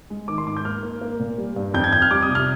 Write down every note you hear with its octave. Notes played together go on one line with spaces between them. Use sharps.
G#3
D#3 D6
C6
G#2 D6
G6
A#3 F6
A#3
A#3
A#2
G3
G2
F2 G6
G#6
F2 G6
F6
G3 D6
D#6
C3
F6